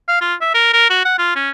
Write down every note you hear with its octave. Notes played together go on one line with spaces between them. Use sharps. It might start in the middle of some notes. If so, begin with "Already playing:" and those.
F5
F4
E5
A#4
A#4
F#4
F#5
F4
C#4